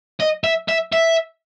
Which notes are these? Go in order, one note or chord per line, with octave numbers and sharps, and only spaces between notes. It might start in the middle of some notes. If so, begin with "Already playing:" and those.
D#5
E5
E5
E5